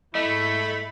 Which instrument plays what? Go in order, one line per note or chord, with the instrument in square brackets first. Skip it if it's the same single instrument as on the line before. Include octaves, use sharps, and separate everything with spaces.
[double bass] G#2 E4 [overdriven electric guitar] A3 [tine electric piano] D#5 [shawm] B5